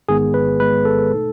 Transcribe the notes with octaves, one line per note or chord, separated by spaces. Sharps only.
A1 G#2 D#3 G#3 B3 G#4
B4
A1 G#2 D#3 G#3 B3 B4
A4
B2 A3 D#4